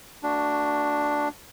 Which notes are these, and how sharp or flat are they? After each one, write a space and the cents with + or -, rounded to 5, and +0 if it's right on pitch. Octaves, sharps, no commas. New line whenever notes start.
A3 +30 D4 +0 F#4 +0